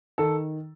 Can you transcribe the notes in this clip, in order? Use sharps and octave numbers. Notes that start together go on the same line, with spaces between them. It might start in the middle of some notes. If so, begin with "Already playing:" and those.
D#3 A4